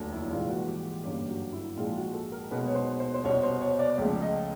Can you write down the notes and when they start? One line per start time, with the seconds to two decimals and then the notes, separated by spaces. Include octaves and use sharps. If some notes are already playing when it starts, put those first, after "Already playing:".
Already playing: F1 D#2 D3 F#3 A3
0.12 E4
0.31 A#1 G#2 E3 G3 F4
0.49 F#4
0.68 G4
0.85 G4
1.04 G1 F#2 D3 G3 A#3 G4
1.28 F#4
1.53 E4
1.77 A#1 G#2 F3 G#3 F4
1.96 F#4
2.14 A4
2.32 A#4
2.51 B1 B2 G#3 B4
2.67 C#5
2.75 C5
3.00 C5
3.14 C5
3.24 C2 B2 G3 C#5
3.43 C5
3.61 C#5
3.79 D5
3.98 C#2 C#3 F3 A3
4.22 D#5